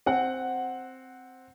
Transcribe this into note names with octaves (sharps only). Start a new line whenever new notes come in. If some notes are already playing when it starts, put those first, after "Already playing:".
C4 F#5